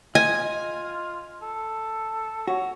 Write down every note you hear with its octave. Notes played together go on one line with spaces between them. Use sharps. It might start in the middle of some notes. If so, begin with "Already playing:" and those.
F4 D#5 G#5
A4
F#4 C#5